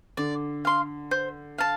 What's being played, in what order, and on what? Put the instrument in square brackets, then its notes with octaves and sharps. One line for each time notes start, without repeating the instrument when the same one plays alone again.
[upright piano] D3 [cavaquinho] D5
[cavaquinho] F5 C6
C5
F5 A5